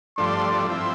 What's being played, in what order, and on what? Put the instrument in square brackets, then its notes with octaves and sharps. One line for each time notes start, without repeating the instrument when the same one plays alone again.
[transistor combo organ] G2 F3 A3 D4 [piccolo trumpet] C6
[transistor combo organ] F3 C4 E4